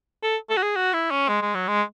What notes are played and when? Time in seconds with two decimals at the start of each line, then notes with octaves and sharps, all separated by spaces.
0.23 A4
0.50 A4
0.57 F#4
0.63 G#4
0.76 F#4
0.94 E4
1.11 C#4
1.28 G#3
1.42 G#3
1.55 F#3
1.68 G#3